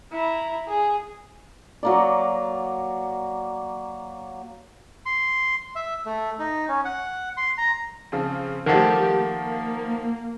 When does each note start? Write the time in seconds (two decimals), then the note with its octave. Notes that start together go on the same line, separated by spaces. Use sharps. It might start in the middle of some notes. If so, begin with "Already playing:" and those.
0.12 E4 A#5
0.68 G#4
1.83 F#3 A#3 D5
5.06 C6
5.76 E5
6.06 A3
6.39 D#4
6.68 C#4
6.85 F#5
7.37 C6
7.58 A#5
8.12 C#3 F3 C4
8.66 D#3 F3 A3 G4 A#4 F#5 A5
9.21 A#3